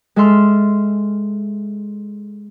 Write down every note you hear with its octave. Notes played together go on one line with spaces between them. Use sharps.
G#3 A4 E5 C6 F6